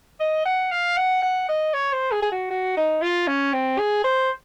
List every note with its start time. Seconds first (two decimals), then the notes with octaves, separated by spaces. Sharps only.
0.20 D#5
0.46 F#5
0.72 F5
0.97 F#5
1.23 F#5
1.49 D#5
1.74 C#5
1.93 C5
2.12 G#4
2.22 G#4
2.32 F#4
2.51 F#4
2.77 D#4
3.02 F4
3.27 C#4
3.53 C4
3.78 G#4
4.04 C5